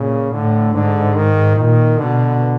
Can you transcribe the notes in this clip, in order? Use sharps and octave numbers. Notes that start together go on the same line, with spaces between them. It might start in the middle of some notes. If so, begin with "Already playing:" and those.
Already playing: A#2 C#3
A2 D3
G#2 D3
D#3
A#2 D#3
B2 D3